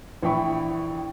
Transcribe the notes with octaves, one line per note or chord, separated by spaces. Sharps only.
A#1 E3 E4 G5 B5 C#6